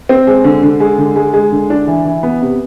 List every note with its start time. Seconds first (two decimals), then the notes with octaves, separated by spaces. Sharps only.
0.09 C4
0.27 G#3
0.44 D3
0.63 D3
0.80 G#3
0.98 D3
1.16 G#3
1.33 G#3
1.52 D3
1.70 D4
1.87 E3
2.05 E3
2.23 B3
2.42 C3